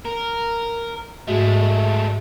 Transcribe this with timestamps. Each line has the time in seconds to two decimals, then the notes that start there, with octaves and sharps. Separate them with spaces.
0.05 A#4
1.28 G#2 G#3 A3 F#4